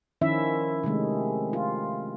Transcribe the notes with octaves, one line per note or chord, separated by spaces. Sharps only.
D#3 F3 C#4 E4 E5
C3 D#3 G#3 A3
F4